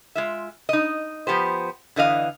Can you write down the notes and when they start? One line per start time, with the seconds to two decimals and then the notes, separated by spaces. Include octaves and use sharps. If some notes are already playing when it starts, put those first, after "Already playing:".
0.15 G#3 F4 E5
0.69 D#4 D#5
1.27 F3 B3 G4 C5
1.96 D3 E3 D#5 F5